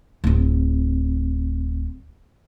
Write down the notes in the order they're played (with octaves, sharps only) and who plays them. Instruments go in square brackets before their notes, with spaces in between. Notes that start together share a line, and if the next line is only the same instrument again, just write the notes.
[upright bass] D1 C4